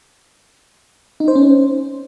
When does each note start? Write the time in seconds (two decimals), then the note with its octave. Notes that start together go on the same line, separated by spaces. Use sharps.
1.20 D#4
1.28 C5
1.35 C#4